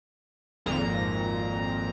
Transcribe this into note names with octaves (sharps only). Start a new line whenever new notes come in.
G#1 F2 A#2 A#5